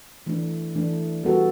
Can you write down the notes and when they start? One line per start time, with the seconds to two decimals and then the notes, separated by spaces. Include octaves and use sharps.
0.26 E3 A3 D4
0.75 E3 A3 D4
1.23 G3 B3 F#4 A4